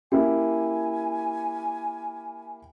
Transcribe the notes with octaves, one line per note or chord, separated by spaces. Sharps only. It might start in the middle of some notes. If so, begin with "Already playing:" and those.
A#3 C#4 E4 G4 G#5